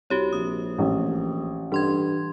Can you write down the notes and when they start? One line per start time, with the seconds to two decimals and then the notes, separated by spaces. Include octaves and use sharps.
0.10 C2 F#4 G4 C#5
0.33 A#1 D#6
0.79 A1
1.72 G2 E3 C6 G#6